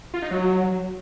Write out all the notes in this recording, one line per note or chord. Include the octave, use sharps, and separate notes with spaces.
F4
D#4
F#3